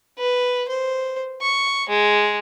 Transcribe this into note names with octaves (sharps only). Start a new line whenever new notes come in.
B4
C5
C#6
G#3